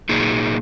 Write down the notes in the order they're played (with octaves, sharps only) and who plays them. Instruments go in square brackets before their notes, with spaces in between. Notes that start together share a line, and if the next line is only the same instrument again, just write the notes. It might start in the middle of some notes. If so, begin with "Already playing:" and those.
[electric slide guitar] A#2 F#3 A#3 D#4 G#4